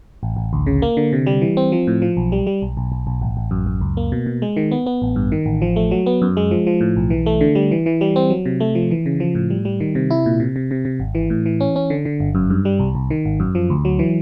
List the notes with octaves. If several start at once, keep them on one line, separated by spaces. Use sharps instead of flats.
A1
A1
D2
C#3
A#3
D3
C3
G3
E3
C4
F3
A2
F3
B1
G3
G3
B1
B1
B1
B1
A1
A1
F#2
F#2
C#2
A#3
B2
B2
G#3
D#3
B3
B3
A1
G2
D#3
A1
F3
A3
F#3
B3
F#2
G#3
F3
F3
A2
B1
E3
A3
D3
G3
E3
E3
G3
C4
F#3
C3
A3
F3
E3
C#3
F3
A2
G3
G3
D#3
C3
E4
A#2
C3
C3
C3
C3
G#1
E3
A2
E3
C#4
C#4
D3
D3
G1
F#2
G2
G3
C2
C2
D#3
G#1
F#2
F3
D2
F#3
E3